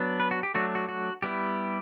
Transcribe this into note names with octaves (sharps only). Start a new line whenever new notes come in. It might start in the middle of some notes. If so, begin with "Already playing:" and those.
Already playing: F#3 B3 D4
B4
F#4
G4
F#3 A3 D4 F#4
F#4
F#4
G3 B3 E4 G4